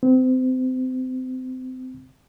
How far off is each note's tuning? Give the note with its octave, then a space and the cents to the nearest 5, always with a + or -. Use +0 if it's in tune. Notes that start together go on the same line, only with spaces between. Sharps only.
C4 -30